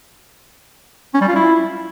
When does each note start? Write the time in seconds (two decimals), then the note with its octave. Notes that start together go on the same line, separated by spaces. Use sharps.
1.14 C#4
1.21 G3
1.28 F4
1.35 E4